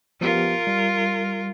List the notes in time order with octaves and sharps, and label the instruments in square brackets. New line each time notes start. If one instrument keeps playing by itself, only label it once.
[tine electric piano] F3 B3 G4 [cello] F4 A#4
[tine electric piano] G3